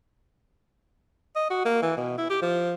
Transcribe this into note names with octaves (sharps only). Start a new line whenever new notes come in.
D#5
F#4
A#3
E3
B2
E4
G4
F3